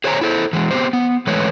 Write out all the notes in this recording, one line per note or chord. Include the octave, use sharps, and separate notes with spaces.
G#4 C5 C#5 F5 G#5 A#5
E4 A4 C5
E3 G#3
B3 C4 G4 C5
B3
E3 G#3 A3 B4 C#5